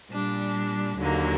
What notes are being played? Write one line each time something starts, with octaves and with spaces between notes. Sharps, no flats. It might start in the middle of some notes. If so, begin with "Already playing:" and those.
A#2 G3 D4
D#2 D3 F#3 A#3